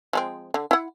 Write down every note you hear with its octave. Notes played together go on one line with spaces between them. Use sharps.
F3 G#3 C4
D3
E4 F#5